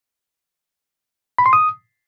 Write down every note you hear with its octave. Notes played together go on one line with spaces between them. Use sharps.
B5
C6
D#6